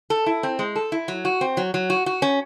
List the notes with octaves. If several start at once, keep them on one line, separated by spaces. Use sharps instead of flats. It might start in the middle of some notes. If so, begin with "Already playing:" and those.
A4
E4
C4
G#3
A4
E4
F#3
F#4
C4
F#3
F#3
F#4
F#4
C#4